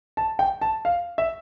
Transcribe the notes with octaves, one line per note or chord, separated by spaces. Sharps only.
A5
G5
A5
F5
E5